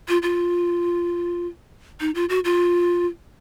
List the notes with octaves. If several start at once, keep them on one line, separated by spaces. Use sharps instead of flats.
F4
F4
D#4
F4
F#4
F4